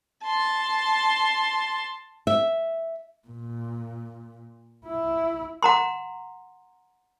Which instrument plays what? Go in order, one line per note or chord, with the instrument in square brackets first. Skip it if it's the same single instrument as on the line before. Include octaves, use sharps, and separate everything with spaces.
[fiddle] A5 C6
[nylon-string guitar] E5
[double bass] A#2
E4
[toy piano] F#5 A#5 C6